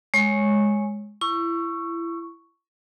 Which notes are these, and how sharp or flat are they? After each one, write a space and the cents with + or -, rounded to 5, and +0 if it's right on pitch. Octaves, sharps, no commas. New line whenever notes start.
G#3 +0 C#5 +0 C#6 -15
E4 +25 C#6 +0